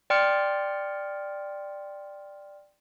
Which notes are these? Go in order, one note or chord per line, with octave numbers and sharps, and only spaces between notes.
D5 G5 C6 F6 C#7